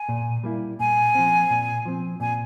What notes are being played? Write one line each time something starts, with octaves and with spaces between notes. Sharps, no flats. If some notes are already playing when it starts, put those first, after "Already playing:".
Already playing: G#5
A#2
G3 A#3 E4
A#2 G#5
F3 C4
A#2
F3 C4
A#2 G#5